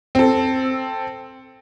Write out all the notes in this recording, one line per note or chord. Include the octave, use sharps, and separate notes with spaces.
C4 A4